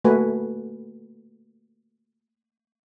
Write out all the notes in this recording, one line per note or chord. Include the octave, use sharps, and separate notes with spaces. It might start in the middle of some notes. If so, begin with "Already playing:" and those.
A3 A#3 F#4 B4 G#5